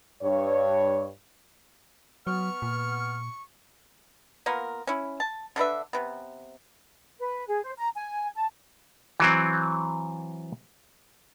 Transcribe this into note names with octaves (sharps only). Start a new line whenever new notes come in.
G2 C#5
F#3 B3 C#6 F6
A#2
A#3 B3 F4 A#4
C#4 E4
A5
D3 D4 B4 E5
C3 B3
B4
G#4
C5
A#5
G#5
A5
E3 F#3 C4